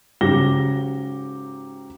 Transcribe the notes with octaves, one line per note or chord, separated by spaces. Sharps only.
G#2 C#3 F#3 G4 A#6 G7